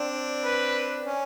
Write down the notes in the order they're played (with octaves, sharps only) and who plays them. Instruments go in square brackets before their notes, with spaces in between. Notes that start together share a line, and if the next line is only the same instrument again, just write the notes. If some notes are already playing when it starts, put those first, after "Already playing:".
Already playing: [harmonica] C4 D4
[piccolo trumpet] B4
[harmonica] C#4